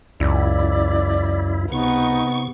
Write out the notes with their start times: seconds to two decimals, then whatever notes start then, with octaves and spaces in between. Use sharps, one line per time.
0.20 C#2 F#2 E4 D5
1.72 C3 B3 D#4 C#6